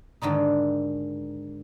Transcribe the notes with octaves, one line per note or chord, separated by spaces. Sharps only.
G#2 D3 D#3 D#4